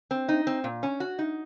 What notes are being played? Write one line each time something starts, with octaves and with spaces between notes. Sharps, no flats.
C4
D#4
C4
A#2
C#4
F#4
D#4